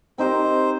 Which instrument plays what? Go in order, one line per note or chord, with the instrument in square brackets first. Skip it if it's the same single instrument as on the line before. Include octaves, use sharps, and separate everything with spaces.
[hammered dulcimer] C4 D#4 G4 A#4 [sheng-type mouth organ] C5